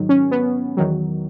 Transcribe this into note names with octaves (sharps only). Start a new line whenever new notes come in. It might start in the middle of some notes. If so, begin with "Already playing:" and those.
Already playing: G#2 D#3 F#3
C#4
B3
E2 D#3 F#3